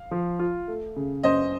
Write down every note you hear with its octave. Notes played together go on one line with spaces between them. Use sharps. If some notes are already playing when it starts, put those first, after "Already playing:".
Already playing: F5
F3
F4
A3
C#3
F#2 C5 D#5